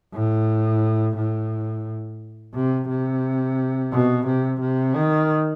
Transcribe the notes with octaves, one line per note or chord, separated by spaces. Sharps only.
A2
A2
C3
C3
B2
C3
C3
D#3